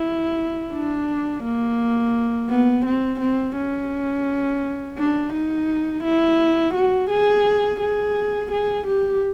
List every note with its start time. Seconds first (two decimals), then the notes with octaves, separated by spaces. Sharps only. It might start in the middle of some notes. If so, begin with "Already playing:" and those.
Already playing: E4
0.73 D4
1.44 A#3
2.50 B3
2.86 C4
3.20 C4
3.57 C#4
4.98 D4
5.33 D#4
6.04 E4
6.75 F#4
7.11 G#4
7.81 G#4
8.52 G#4
8.87 G4